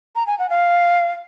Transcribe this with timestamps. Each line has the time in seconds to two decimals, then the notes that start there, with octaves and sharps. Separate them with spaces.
0.16 A#5
0.27 G#5
0.39 F#5
0.50 F5